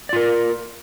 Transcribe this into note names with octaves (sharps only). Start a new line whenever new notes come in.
F4 A#4 D5